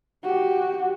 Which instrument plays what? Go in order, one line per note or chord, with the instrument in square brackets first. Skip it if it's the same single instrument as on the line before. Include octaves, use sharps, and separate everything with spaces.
[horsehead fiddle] F#4 G4